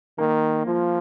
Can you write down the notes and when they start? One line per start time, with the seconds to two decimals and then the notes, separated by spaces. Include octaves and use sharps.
0.18 D#3 A#3
0.66 F3 F4